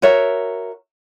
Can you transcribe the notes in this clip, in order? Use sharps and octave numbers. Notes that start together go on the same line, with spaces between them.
F#4 A#4 C#5 E5